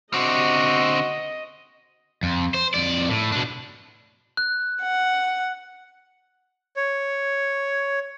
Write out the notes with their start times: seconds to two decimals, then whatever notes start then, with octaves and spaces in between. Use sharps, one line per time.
0.14 D3 C4 F#4 D#5
2.23 F2
2.54 C5
2.74 F2 D5
3.10 A2
3.32 B2 D4
4.37 F#6
4.82 F#5
6.76 C#5